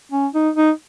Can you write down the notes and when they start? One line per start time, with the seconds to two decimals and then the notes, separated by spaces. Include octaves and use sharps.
0.12 C#4
0.34 D#4
0.56 D#4